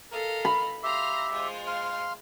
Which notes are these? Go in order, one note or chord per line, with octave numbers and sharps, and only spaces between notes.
A4 A#4 D#5 F5
B5
G4 E5 F5 A#5 C6
G#3 F4 C5
F5 C6